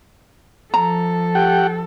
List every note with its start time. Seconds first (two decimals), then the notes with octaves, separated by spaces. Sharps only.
0.74 F3 A4 A#5
1.35 G4 F#5 G5